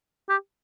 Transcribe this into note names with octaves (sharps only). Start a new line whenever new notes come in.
G4